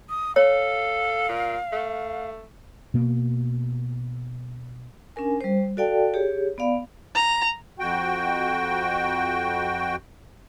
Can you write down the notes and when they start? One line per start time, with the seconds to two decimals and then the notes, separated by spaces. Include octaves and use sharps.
0.09 D#6
0.36 A4 C#5 F5
1.29 A#2
1.72 A3
2.94 B2 A#3
5.16 C#4 D4 A#4 G#5
5.41 G3 C5
5.77 F#4 A4 D5 F5 G5 A5
6.14 G4 G#4 C#5
6.58 B3 D5 F5 B5
7.15 A#5
7.79 F2 F#4 G5